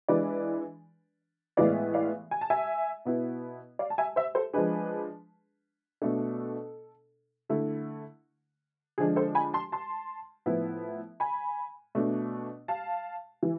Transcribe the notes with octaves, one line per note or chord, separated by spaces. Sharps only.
E3 G#3 D4 B4 D5
A2 E3 G#3 B3 D5 F5
D5 F5
G#5
A5
E5 G#5
B2 B3 E4
D5 F5
A5
E5 G#5
C5 E5
A4 C5
F3 G#3 D4 G#4 B4
B2 A3 D4 A4
D3 A3 E4
D3 F3 G#3 D4 G#4
A4 C5
G#5 B5
A5 C6
A5 C6
A2 F3 B3 E4
G#5 B5
B2 A3 D4
F5 A5
E3